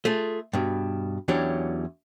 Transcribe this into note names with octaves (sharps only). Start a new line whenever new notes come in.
A3 F4 G#4
G2 B2
E2 E3 F#3 C#4 D4 G4